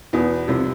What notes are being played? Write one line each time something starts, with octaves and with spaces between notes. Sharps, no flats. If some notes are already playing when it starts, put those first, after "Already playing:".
E2 B2 B3
C2 C3 F3